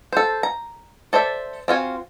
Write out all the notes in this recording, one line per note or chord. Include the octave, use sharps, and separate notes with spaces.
A4 C5
A#5
A4 C5 D5 E5
C4 F4 F#4 G#5